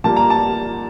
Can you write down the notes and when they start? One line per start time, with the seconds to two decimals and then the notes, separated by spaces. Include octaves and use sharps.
0.04 A#2 G3 A#3 A5
0.17 A#5
0.30 A5